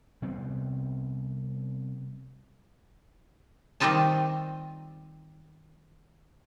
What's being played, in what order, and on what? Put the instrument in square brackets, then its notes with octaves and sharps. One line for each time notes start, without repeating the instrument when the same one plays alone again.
[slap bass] C3 G3 B3 C4
[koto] D#3 G3 C4 D#4 F4 A5